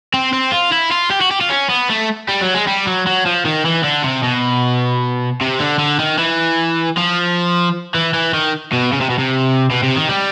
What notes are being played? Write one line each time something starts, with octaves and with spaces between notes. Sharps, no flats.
C4
C4
F4
E4
F4
G4
F#4
G4
F4
C#4
B3
A3
G3
F#3
G#3
G3
F#3
F#3
F3
D#3
E3
D3
C3
B2
C3
D3
D3
D#3
E3
F3
E3
E3
D#3
B2
C#3
C3
B2
C3
B2
C3
D#3
G3